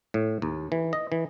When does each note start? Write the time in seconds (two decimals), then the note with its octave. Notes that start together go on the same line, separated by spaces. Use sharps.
0.14 A2
0.42 D#2
0.72 E3
0.93 D#5
1.12 E3